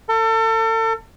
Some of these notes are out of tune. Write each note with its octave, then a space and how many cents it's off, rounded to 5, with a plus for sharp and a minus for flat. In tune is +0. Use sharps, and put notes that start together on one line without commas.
A4 +35